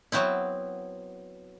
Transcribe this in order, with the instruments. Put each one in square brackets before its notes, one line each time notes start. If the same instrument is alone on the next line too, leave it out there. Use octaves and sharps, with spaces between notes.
[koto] F#3 B3 C4 E4